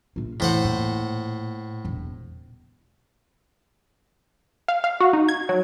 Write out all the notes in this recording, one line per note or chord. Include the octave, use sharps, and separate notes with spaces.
A#1 F4
F1 A2 E3 C5 F#5
A#2
E1 A#1
F5
F5
F#4
D#4
G#6
F#3